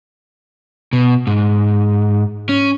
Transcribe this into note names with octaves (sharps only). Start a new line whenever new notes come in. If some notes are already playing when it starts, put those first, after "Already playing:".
B2
G#2
C#4